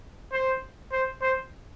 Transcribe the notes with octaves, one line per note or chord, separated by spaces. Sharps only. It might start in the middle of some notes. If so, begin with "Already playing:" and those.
C5
C5
C5